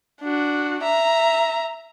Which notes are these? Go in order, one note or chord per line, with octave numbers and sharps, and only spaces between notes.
D4 F#4
E5 A#5